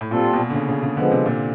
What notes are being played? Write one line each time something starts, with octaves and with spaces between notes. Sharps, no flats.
A2
A#2 G3 C4 F4 A4
B2
D3
C#3
C#3
C#3
D3 F3 G#3 B3
C3
A#2